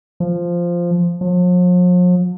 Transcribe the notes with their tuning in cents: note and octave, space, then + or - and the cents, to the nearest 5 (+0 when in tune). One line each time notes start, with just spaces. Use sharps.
F3 -5
F3 +45